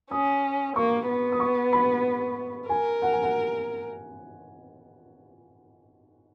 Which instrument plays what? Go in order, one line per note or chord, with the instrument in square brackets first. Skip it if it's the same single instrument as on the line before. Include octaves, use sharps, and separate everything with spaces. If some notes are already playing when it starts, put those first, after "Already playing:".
[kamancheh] C#4 [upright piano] D#6
[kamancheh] A#3 [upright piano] C#6
[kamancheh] B3
[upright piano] D#6
C#6
B5
[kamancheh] A#4 [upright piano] G#5
[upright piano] F#5
G#5
F#5